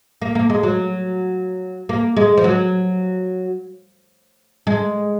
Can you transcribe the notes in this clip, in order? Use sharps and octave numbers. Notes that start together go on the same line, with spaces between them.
A#3
A#3
G#3
F#3
A#3
G#3
F3
F#3
G#3